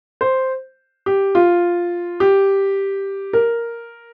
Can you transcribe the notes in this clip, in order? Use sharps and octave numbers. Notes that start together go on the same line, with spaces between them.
C5
G4
F4
G4
A#4